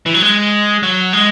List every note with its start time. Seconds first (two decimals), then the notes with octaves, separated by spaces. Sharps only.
0.06 E3
0.14 F#3
0.22 G#3
0.83 F#3
1.13 G#3